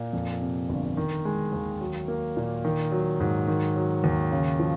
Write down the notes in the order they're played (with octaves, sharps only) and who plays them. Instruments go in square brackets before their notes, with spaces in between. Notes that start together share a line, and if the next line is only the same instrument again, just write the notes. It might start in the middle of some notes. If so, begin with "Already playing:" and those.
Already playing: [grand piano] A#2
F2
C3
G1
D#3
G#3
D#2
F#3
A#3
A#2
D#3
F#3
G#2
D#3
F#3
D#2
C#3
F3